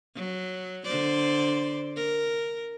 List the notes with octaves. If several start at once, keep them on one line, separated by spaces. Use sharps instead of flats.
F#3
D3 C5 D5
A#4